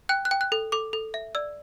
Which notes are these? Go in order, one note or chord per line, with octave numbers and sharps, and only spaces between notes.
G5 F#6
F#6
G5
F#6
A4
A4 D6
A4
E5
D5 E6